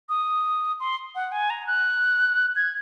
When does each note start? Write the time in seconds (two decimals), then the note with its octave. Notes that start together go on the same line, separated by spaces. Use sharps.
0.09 D#6
0.80 C6
1.15 F#5
1.32 G#5
1.50 A#5
1.67 F#6
2.56 G#6